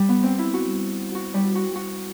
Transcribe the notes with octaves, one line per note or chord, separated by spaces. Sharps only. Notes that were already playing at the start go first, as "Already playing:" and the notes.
Already playing: G3
B3
C4
E4
F#4
F#4
G3
F#4
F#4